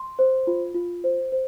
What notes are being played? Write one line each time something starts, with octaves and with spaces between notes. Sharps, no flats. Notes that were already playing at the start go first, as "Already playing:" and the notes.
Already playing: C6
C5
F4
F4
C5
C5